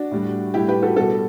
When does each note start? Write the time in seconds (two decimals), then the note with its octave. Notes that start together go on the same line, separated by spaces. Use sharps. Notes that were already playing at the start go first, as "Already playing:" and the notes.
Already playing: D4 F#4
0.11 A2 G3
0.54 A2 G3 E4 G4
0.68 G4 B4
0.83 F#4 A4
0.96 B2 G3 F#4 A4